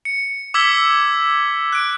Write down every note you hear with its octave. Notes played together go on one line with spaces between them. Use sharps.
C#7
D6 E6 G#6 B6 F#7 G7
F#6 D7